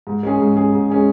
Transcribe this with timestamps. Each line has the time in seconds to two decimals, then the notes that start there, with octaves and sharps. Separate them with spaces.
0.07 G#2
0.23 G#3 C#4 G#4
0.39 G#2
0.56 G#3 C#4 G#4
0.73 G#2
0.90 G#3 C#4 G#4